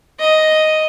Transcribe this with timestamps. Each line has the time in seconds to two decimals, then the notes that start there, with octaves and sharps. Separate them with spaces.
0.19 D#5